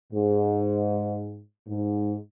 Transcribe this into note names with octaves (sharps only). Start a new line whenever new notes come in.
G#2
G#2